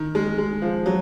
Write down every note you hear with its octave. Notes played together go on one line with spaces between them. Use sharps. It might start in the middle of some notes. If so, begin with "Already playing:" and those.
Already playing: D#3
G#3
G#3
F3
F#3